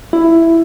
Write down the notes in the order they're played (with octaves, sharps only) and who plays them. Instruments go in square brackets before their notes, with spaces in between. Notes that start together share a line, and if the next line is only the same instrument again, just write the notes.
[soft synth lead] E4